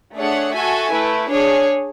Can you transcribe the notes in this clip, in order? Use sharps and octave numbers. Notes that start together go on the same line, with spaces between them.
A3 D4 G#4 C#5 F#5
F#4 A4 E5 G#5
A3 E4 B4
D4 G#4 C#5